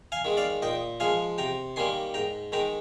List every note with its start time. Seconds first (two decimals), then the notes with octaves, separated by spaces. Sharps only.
0.12 F5 G#5
0.25 D#3 G#3
0.37 D5 F5
0.62 A#2 D#5 G5
1.00 F3 G#3 F5 G#5
1.38 C3 G5 A#5
1.76 D#3 G3 A#3 G#5 C6
2.14 G#2 G5 A#5
2.52 D#3 G#3 G5 A#5